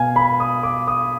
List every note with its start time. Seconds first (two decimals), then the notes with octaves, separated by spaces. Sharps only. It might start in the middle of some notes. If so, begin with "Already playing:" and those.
Already playing: B2 F5 G#5
0.16 B5
0.40 D#6
0.63 D6
0.87 D#6